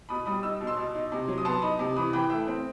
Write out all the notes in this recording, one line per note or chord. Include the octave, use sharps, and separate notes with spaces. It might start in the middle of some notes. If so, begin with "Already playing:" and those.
B2 B5 D#6
G3 B5 D#6
D#4 E6
B2
C6 E6
B2
D#4
C3
F#3
D#6
B3 A5 C6
D#4 B5 D#6
C3
E3 B5 D#6
E3 G5 B5
A3 E5 G5
C4